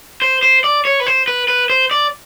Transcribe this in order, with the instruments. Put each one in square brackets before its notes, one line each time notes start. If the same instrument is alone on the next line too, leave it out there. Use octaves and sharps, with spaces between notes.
[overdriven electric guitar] C5
C5
D5
C#5
B4
C5
B4
B4
C5
D5